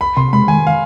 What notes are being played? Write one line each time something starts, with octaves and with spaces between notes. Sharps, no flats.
C2 B5
C3 C6
G#3 B5
D#3 G#5
F5